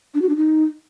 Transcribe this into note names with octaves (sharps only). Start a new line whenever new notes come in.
D4
F#4
D4
D#4